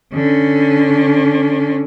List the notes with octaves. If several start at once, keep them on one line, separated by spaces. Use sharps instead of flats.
D3 C#4